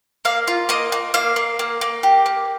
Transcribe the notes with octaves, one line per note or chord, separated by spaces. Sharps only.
A#3 F5
F4
A#3 D#5
A#3
A#3 F5
A#3
A#3
A#3
G4
A#3